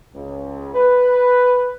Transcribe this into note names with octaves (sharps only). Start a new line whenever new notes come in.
C#2
B4